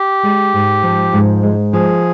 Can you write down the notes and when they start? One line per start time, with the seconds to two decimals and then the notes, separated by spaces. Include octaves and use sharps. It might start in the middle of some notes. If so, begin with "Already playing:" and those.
Already playing: G4
0.23 G#3
0.53 G#2
0.83 F3
1.13 G#2
1.43 G#3
1.73 F3 G#4